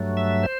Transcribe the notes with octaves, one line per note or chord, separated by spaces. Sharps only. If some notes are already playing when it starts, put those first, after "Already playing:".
Already playing: G2 F#3 A3
E5
C5